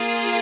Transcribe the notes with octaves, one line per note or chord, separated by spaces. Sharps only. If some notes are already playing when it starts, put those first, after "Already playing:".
Already playing: A#3 F4 G#4